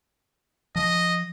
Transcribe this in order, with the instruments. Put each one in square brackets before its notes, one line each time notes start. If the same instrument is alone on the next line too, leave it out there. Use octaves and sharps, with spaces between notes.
[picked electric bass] F3 [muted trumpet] D#5